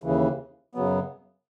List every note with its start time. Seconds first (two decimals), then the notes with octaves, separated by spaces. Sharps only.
0.04 D#2 C#3 E3
0.75 F#2 C#3 F#3 B3